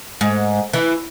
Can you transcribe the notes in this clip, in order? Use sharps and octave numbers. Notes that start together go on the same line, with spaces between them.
G#2
E3